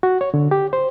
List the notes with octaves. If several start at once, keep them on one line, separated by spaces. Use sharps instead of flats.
F#4
C#5
D3
G4
C5